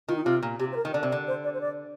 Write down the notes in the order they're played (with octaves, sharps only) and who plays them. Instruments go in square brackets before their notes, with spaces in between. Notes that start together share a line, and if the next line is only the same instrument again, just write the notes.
[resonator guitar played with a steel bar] D#3 [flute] F4
[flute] D#4
[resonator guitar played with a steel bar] C3 [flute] F4
[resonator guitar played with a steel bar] A#2
[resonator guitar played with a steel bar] C3 [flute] G4
[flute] C5
A#4
[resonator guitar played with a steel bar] D#3
[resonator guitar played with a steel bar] D3 [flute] D5
[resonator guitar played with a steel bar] C3
[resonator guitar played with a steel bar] D3 [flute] D5
[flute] C5
D5
C5
D5